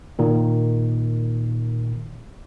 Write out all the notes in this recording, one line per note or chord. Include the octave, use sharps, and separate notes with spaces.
A#2 D#3